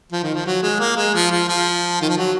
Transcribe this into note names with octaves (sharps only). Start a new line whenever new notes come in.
F3
D#3
F3
F#3
G#3
A#3
G#3
F3
F3
F3
D#3
F3
F#3